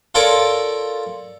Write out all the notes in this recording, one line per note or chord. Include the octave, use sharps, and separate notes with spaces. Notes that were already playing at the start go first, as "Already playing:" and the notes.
F4 A4 A#4 C#5 D5